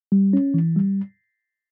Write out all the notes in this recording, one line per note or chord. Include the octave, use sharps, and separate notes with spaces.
G3
C#4
E3
G3